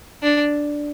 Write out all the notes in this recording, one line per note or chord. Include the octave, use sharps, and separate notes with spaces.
D4